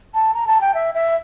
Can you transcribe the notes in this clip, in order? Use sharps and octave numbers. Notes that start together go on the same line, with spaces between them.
A5
A#5
A5
G5
E5
E5